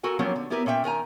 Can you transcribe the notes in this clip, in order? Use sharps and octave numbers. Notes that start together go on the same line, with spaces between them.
F#4 A4 A#4 G#5
F3 F#3 A#3 B3 C#4 G4
D3
B3 E4 G4 A#4 B4
A#2 C#4 E5 G5
D#3 A#4 G#5 A#5